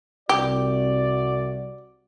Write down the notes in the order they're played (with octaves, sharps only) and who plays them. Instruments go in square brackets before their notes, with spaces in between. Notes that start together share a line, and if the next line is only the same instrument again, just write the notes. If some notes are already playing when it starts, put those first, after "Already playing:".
[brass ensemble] C2 F#4 D5 [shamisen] G4